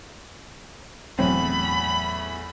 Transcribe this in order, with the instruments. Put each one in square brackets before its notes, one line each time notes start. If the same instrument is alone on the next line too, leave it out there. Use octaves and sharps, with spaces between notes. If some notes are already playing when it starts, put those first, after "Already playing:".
[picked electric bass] E1 F#3 C4 [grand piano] E2 A2 [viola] B5